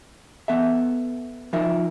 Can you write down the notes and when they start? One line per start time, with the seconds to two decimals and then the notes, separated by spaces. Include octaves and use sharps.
0.48 B3 A4 E5
1.53 F3 D#4 F4 A#4 E5